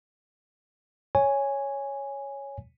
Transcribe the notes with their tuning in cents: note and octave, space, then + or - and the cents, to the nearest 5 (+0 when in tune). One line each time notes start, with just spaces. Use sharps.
C#5 +0 G#5 -5